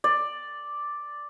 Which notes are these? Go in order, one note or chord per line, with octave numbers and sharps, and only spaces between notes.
D5